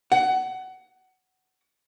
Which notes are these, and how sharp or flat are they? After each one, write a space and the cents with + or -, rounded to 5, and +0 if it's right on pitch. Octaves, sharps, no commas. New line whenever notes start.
F#5 +20